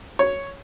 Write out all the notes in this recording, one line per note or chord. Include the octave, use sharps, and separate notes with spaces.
C#5